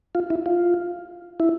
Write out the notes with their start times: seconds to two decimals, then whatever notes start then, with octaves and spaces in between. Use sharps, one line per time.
0.15 F4
0.30 E4
0.46 F4
1.40 E4